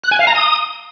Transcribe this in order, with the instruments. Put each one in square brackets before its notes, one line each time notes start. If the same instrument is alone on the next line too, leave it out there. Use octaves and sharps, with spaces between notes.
[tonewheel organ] F#6
G#5
F5
A#5
D#6